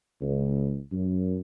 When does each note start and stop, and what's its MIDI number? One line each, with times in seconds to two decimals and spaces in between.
0.21 0.80 37
0.92 1.39 42